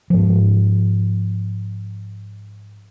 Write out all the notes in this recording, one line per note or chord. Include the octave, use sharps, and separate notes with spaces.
G#2 F3